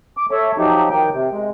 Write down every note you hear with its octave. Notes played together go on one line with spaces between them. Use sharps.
D6
A4 C#5 E5
F3 F#3 D#4 G4
D#3 G5
C3
G#3